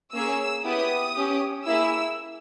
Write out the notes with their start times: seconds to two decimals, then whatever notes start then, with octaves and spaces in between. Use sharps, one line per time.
0.12 A#3 C#4 G#4 E6
0.64 B3 E4 G4 D#6
1.16 C#4 G4
1.66 A#3 E4 G#4 E6